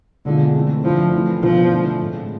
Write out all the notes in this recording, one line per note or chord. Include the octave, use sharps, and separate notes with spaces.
B2 D3 G#3 D4 F4
E3 A3 C4
D3 F3 A3 E4
E3 A3 C4 E4
B2 F3 B3 D4 F4
D3 A3 E4
A2 G#3 C4